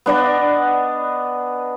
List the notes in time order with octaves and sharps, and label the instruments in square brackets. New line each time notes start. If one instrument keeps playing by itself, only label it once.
[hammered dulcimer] B3 D4 D5 D#5